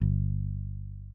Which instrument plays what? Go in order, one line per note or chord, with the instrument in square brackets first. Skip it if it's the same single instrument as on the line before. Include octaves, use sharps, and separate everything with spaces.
[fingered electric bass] G1